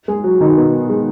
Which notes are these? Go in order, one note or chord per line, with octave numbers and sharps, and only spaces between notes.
G#3 G#4
F#3 F#4
D#3 D#4
B2 B3
G#3